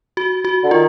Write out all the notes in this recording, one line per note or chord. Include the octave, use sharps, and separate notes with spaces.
F#4
F#4
D3
D#3 F4